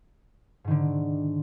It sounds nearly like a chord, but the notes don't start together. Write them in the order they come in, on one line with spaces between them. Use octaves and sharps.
G#2 D#3 D3